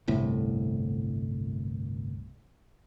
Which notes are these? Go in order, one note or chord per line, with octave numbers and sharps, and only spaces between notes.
G1 C2 A2